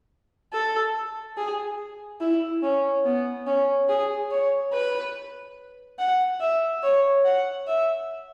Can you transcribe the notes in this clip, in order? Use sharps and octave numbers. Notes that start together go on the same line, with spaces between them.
A4
G#4
E4
C#4
B3
C#4
G#4
C#5
B4
F#5
E5
C#5
F#5
E5